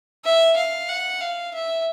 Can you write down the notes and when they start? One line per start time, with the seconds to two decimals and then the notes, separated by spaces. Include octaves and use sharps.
0.25 E5
0.56 F5
0.89 F#5
1.21 F5
1.53 E5